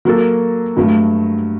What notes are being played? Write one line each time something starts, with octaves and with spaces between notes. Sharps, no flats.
F#3 A#3 F#4 A4
G2 F#3 A3